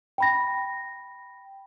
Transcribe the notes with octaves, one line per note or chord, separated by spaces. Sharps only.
G5 B5 A#6